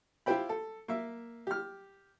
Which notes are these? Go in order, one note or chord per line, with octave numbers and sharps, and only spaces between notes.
E4 F4 G4 C5 G5 B5
A4
A#3 E5
G4 F6